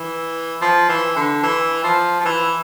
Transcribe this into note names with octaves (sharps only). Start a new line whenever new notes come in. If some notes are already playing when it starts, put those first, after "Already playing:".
Already playing: E3
F3
E3
D3
E3
F3
F3
E3